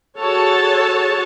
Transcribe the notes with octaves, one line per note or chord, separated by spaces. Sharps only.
F#4 G#4 A4 C#5 A5